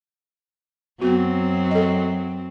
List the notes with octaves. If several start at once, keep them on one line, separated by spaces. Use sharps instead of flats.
F#2 F#3 B3 C4 F#4
A4 D#5